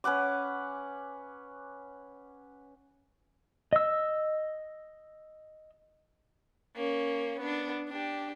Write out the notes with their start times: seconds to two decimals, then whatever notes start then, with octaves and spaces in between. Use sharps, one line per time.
0.04 C#4 B4 F#5 D6
3.73 D#5 E6
6.76 A#3 C#4
7.40 B3 D4
7.89 D4 G4